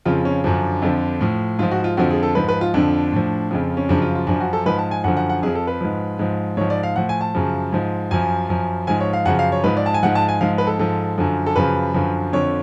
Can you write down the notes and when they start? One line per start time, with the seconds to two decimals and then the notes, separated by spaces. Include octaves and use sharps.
0.06 F2 C#3 F3 F4
0.25 C#4
0.44 F#2 D3 F3 D4
0.82 F2 D3 F3
1.21 A2 F3
1.59 G#2 F3 F4
1.71 F#4
1.84 F4
1.97 F2 D3 F3 F#4
2.11 G#4
2.23 A4
2.35 G#2 F3 B4
2.48 B4
2.61 F4
2.74 F2 D3 F3 D4
3.12 A2 F3
3.51 F2 C#3 F3
3.77 C#4
3.89 F#2 C#3 F3 D4
4.02 F4
4.15 F4
4.27 F#2 F3 D4
4.40 F#4
4.53 A4
4.66 G#2 F3 B4
4.78 A5
4.91 G#5
5.04 F#2 D3 F3 F#5
5.17 F#5
5.29 F#5
5.43 F2 F3 G#4
5.55 A4
5.67 B4
5.81 G#2 F3
6.19 G#2 F3
6.57 G#2 F3 C#5
6.70 D5
6.83 F5
6.96 A2 F3 F#5
7.09 G#5
7.21 A5
7.35 F#2 C#3 F3
7.73 G#2 F3
8.11 F#2 F3 G#5
8.49 F#2 F3
8.87 G#2 F3 G#5
9.00 C#5
9.13 F5
9.26 F#2 C#3 F3 F#5
9.39 F5
9.52 C#5
9.64 G#2 F3 B4
9.77 D5
9.86 A5
9.94 G#5
10.03 G#2 F3 F#5
10.15 A5
10.29 G#5
10.41 G#2 F3 F5
10.58 B4
10.67 A4
10.79 G#2 F3 A4
11.18 F#2 D3 F3
11.46 A4
11.56 F#2 C#3 F3 B4
11.94 F#2 D3 F3
12.32 F2 D3 F3 C#5